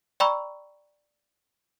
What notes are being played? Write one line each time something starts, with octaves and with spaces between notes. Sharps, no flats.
D5 G5 A#5 B5 C#6 E6